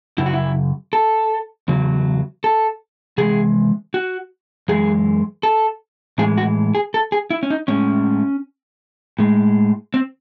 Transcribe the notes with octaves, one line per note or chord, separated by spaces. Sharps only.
F#2 C#3 E4
F#4
E4
A4
E2 C#3 F#3
A4
C3 E3 G#3 G#4
F#4
F#2 E3 G#3 G#4
A4
A2 E3 G#3 G#4
F#4
G#4
A4
G#4
E4
C#4
D#4
A2 G#3 C#4
A2 G#3
C4